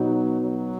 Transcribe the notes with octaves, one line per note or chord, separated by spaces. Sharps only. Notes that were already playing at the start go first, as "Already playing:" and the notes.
Already playing: B2 F#3 B3 D#4 F#4
F#3